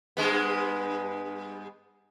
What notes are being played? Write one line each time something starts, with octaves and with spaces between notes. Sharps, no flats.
G2 G#3 B3